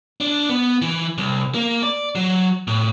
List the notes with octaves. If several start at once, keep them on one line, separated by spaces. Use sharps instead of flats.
D4
B3
E3
C2
A#3
D5
F#3
A2